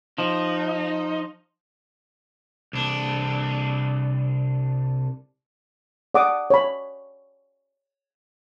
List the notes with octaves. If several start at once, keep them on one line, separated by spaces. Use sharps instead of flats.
F3 D#4
C2 D4
D5 F#5 D6 D#6
C#5 B5